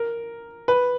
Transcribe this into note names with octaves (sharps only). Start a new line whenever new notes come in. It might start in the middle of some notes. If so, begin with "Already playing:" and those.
Already playing: A#4
B4